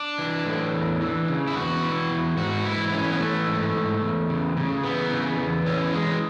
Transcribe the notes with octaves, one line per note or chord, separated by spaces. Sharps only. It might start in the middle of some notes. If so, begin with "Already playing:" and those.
Already playing: D4
E3
A2
E2
E3
C#3
E4
E2 F#4
E3
E2
G#2 F#4
E3 E4
E3 C#4
B3
E3 A3
G#2
G#2
E2
C#3
C#3
E3 B3
C#3
E2
E3 C#4
E3 G#3